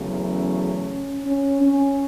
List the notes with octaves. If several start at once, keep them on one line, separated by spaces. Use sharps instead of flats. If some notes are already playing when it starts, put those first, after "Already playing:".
Already playing: E2 C#3 F#3 A3
C#4
C#4
C#4